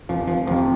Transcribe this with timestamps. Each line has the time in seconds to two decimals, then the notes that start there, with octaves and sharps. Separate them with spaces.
0.09 F1 F3
0.27 F3
0.47 F2 C3 F3